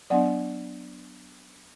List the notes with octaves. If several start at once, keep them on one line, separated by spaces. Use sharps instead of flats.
F#3 B3 D4 D5 F#5